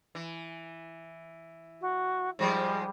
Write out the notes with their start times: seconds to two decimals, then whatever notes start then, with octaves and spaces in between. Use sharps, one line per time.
0.15 E3
1.81 F#4
2.39 G#2 F3 G3 G#3